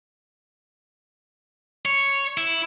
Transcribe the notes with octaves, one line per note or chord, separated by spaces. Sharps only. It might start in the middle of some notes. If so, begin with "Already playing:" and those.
C#5
E4